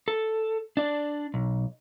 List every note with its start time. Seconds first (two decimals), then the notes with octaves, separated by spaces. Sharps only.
0.08 A4
0.77 D4 D5
1.34 B1